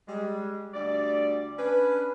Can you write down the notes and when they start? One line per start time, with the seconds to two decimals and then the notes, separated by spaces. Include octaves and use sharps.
0.08 G3 G#3
0.74 D2 G3 D5
1.58 C#4 D4 B4